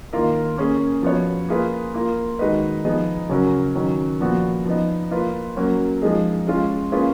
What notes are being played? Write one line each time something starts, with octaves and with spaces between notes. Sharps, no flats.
D#3 A#3 F4 A#4
A#3 C#4 G#4
F3 B3 F#4 C#5
A#3 F4 G#4 B4
A#3 F4 A#4
D#3 G#3 D#4 F#4 B4
F3 B3 D#4 G#4
C#3 F#3 C#4 F#4 A#4
D#3 F#3 C#4
A#2 F3 B3 F#4
F3 B3 D#4
A#3 F4 B4
F#3 A#3 C#4 F#4
F3 G#3 D#4 G#4
G#3 C#4 F4
A#3 C#4 F4 G#4 B4